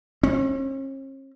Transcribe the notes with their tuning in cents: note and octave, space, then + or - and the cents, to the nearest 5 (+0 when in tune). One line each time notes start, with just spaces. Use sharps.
C#4 -45